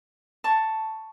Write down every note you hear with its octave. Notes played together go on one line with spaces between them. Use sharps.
A5 C#6